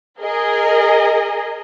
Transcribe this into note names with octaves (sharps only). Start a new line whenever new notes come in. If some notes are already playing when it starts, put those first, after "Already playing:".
G#4 A#4 D#5